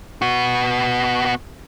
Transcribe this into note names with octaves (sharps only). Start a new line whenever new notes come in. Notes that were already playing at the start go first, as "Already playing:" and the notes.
B3 F#4